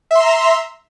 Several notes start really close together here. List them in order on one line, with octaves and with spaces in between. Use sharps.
E5 C6 A#5